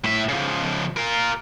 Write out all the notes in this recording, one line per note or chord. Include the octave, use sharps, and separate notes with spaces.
A2 E5
C#3 F3
F4 A#4